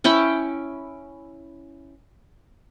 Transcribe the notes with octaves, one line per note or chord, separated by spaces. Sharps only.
C#4 E4 G5 B5